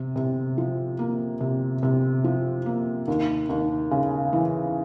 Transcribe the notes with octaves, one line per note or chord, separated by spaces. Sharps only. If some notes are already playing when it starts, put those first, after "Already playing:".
Already playing: C3
C3
F3
A#3
C3
C3
F3
A#3
D#2
D#2
C#3
E3